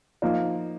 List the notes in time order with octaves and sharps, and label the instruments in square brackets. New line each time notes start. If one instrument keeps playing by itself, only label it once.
[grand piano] F3 A#3 D#4